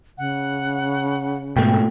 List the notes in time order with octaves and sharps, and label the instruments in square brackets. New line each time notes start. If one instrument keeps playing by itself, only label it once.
[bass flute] C#3 [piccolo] F#5
[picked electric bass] G#2 B2 [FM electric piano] A3 G5